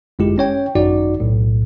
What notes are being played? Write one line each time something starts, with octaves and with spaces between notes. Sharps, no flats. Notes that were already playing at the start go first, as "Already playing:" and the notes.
G1 F#2 G#3 E4 G4
C#4 C#5 G5
G#1 F#2 D#4 F#4 D5
B1 A2